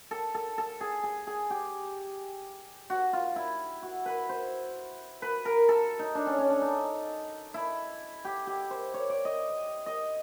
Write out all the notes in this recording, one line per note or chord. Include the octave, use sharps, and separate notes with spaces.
A4
A4
A4
G#4
G#4
G#4
G4
F#4
F4
E4
F#4
B4
C5
B4
A#4
A4
D#4
D4
C#4
C#4
D4
D#4
E4
G4
G4
C5
C#5
D5
D#5
D#5